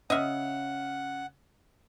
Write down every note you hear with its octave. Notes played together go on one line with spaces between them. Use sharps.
C#3 D#5 E5 F#5 F6